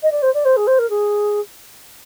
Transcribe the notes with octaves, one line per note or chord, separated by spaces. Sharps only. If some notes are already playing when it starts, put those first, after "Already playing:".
D#5
D5
C5
D5
C5
G#4
C5
A#4
G#4